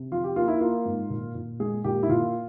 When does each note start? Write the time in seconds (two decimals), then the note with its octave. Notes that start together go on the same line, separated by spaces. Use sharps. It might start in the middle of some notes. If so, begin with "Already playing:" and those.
Already playing: C3
0.12 F3 F4
0.24 G4
0.36 A#3 F4
0.48 E4
0.61 A#3 F4
0.86 G#2
1.10 A#2
1.35 A#2
1.60 G#3 G#4
1.84 A#2 G4
2.03 E4
2.09 A#2 F4